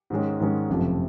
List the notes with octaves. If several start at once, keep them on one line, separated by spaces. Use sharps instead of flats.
G#2 D#3 G#3 C#4
G#2 D#3 G#3 C#4
F#1 F2 C3 F3 A3